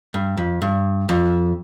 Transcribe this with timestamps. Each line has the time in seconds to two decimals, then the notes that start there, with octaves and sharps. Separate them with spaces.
0.14 G2
0.37 F2
0.62 G2
1.09 F2